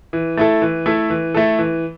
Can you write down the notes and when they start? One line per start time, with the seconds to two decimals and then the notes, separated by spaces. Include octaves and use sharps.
0.13 E3
0.37 A3 E4 A4
0.62 E3
0.86 A3 E4 A4
1.10 E3
1.35 A3 E4 A4
1.59 E3